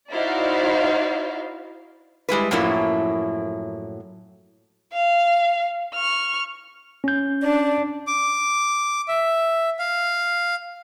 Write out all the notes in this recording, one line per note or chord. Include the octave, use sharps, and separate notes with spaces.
D#4 E4 F#4 C5 D5 F5
G3 G#3 E4 B4
F#2 A2 F3 F#3 A#3 E4
F5
C#6 F6
C#4 G6
D4
D6
E5
F5